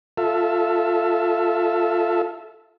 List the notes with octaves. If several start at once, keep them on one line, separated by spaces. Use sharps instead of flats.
F4 A4 E5